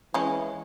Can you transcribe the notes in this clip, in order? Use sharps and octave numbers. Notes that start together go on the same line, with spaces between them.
E3 G#3 C#4